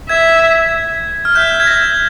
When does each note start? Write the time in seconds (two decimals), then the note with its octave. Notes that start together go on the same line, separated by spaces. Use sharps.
0.09 E5 G#6
1.25 F6
1.35 E5 G6
1.60 G#6
1.67 A#6